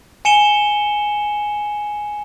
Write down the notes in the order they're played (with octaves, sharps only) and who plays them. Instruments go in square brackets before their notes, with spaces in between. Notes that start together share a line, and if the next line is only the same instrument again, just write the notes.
[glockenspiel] G#5 C#7 E7 G7